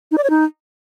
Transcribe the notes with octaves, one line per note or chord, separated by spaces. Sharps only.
D#4
D5
C#5
D#4